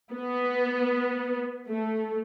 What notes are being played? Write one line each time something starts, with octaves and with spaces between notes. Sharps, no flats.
B3
A3